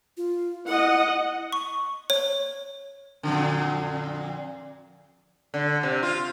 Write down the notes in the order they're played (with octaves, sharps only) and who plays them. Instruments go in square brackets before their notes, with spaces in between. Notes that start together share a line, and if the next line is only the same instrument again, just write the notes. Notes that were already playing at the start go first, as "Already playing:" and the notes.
[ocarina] F4
[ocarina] E4 [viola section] D#5 F#5
[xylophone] C#6
C#5
[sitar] F2 A#2 D3
D3
C3
F4